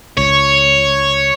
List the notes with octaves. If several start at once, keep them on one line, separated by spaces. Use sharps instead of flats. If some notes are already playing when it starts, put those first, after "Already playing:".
C#2 C#5